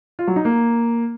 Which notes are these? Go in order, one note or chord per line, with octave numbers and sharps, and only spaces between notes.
F4
F#3
D#4
A#3